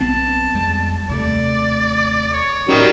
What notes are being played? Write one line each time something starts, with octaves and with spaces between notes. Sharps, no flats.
B1 B3 C4 A5
F2 G3 G#3
D#2 C3 A3 D5
C#5
A2 D#3 F#3 G3 C#4